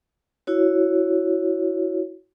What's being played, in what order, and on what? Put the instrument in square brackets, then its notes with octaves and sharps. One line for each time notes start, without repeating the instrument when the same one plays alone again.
[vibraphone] E4 F#4 C#5